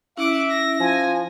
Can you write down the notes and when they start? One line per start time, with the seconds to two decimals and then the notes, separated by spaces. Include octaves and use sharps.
0.17 C#4 E4 E5 F#5 D6
0.50 A#6
0.80 F3 G#5